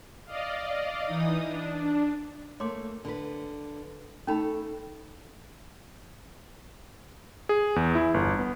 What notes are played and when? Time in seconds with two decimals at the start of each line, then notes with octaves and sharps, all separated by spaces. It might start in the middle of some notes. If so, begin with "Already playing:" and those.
0.25 D5 D#5 F5
1.05 E3 D#4 D#6
1.45 D4
2.60 A3 A#3 C#5 C6 D6
3.05 D3 B4
4.27 A3 C#4 D#4 A4 B5
7.49 G#4
7.76 E2
7.95 E4
8.14 G1
8.39 B3